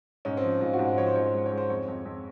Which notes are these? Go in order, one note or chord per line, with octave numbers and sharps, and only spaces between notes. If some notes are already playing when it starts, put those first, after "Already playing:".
G#2 C#4
C4
F3
G#2 F4
F#4
G#2
C5
F3 C#5
C5
G#2 C#5
C5
G#3
C#5
G#3
C5
F2 C#5
F2
F2